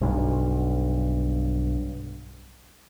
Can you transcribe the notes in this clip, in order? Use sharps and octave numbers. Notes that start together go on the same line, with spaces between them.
B1 G2